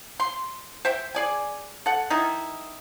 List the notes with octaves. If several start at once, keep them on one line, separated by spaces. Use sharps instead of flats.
C6
C5 E5 G5
G#4 D5 G#5
A4 F#5
D#3 D#4 E4